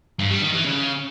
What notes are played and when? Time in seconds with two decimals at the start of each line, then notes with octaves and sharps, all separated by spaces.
0.19 G2
0.30 G3
0.42 D#3
0.53 E3
0.64 C#3